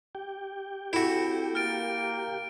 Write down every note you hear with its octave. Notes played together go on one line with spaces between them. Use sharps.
G4 G5
C4 E4 F#4 A4
A#3 F6 A6 D7